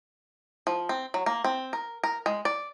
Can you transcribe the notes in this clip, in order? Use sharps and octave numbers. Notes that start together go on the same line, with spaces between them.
F3
C4
F#3
A#3
C4
A#4
A#4
G#3
D5